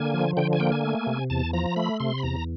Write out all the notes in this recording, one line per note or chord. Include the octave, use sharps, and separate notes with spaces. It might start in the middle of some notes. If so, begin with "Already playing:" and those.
Already playing: D3 A#3 G#5
F3
D3 G5
G#5
A#3 G5
G#5
A3
C3
E2 A5
F3 A#5
A3 B5
C3 C6
B5
E2 A#5